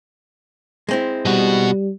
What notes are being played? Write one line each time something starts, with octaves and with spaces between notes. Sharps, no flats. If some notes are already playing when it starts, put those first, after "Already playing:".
G#3 C4 E4
B2 G3 F#4